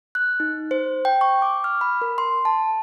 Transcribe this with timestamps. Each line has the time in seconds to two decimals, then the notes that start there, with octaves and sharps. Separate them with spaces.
0.15 F#6
0.40 D#4
0.71 C5
1.05 G5
1.21 C#6
1.42 D6
1.64 F6
1.81 B5
2.02 A#4
2.18 C6
2.45 A5